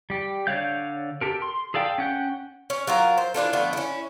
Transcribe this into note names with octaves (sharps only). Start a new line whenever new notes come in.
G3 G4
D3 C#5 D5 F5 G6
G4 A4 A#4
C6
G#4 A4 D5 F5 G5
C#4 F#5 G5
C#4
F#3 F4 A#4
C5
E3 D4 F4 A4
D3 F3 A3 B3
C#4 E4